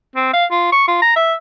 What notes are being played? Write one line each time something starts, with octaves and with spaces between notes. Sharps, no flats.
C4
F5
F4
C#6
F4
A#5
E5